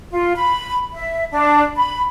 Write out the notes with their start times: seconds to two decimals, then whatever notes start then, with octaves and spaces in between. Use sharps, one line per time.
0.11 F4
0.35 B5
0.94 E5
1.31 D4
1.75 B5